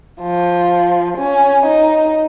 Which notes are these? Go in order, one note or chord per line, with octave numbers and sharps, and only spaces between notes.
F3
C#4
D#4